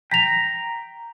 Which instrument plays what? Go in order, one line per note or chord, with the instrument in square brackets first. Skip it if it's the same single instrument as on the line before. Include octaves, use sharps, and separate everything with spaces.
[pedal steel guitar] G5 A#5 [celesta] B6 F7